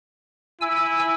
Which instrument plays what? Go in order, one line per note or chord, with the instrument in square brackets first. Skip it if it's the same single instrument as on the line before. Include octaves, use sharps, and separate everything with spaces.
[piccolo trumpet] E4 [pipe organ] G#5 E6